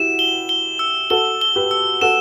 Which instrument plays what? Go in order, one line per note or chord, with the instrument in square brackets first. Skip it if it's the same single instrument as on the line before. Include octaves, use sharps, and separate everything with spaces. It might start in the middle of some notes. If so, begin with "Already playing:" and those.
Already playing: [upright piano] E4 F#4 G4 [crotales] E7
[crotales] G7
G7
E6
[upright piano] F#4 A4 [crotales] G7
[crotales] G7
[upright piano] G4 B4
[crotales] E6
[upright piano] F#4 A4 [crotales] E7